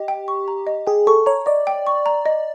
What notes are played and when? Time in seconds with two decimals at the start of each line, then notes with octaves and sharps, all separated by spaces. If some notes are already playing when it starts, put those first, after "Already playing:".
Already playing: G4 D#5
0.08 G5
0.28 C#6
0.48 A#5
0.67 D#5
0.87 G#4 G5
1.07 A4 C#6
1.26 C#5 A#5
1.46 D5 D#5
1.67 G5
1.87 C#6
2.06 A#5
2.26 D#5